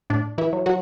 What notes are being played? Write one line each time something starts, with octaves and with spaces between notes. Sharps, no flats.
A2 D4
E3 E4
F#3
F#3 F#4